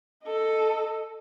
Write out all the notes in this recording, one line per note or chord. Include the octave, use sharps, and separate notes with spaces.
A4 D#5